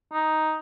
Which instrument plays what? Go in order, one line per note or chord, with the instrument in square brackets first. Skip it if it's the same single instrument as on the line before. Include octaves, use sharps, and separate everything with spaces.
[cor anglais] D#4